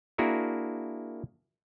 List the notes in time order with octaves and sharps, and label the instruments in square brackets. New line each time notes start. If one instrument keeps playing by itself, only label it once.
[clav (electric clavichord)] A#3 D4 E4 F#4 G#4 A#4